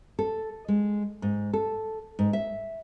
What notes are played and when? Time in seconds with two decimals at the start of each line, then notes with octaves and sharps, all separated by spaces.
0.19 A4
0.68 G#3
1.22 G#2
1.53 A4
2.19 G#2
2.33 E5